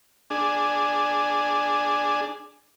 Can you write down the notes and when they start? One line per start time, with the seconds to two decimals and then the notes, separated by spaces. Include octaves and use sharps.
0.30 D4 G#4